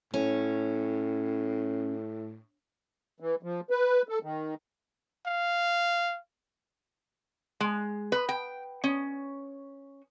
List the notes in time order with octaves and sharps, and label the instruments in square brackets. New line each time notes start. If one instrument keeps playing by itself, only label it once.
[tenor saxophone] A2 [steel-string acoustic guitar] C#4
[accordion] E3
F3
B4
A4
D#3
[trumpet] F5
[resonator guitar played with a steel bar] G#3
B4
G5
C#4